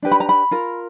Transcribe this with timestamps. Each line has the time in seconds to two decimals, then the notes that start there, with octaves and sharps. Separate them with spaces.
0.02 D4 G4 B4
0.11 B5
0.20 A#5
0.29 B5
0.51 F4 A#4